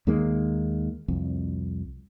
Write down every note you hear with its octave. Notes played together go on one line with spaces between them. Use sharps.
D#2 D#3 G#3 A#3
C2 F2